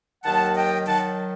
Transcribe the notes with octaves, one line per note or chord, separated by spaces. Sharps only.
D#2 D#3 F#3 F#5 A5
D#5 G5
D#3 F#3 F#5 A5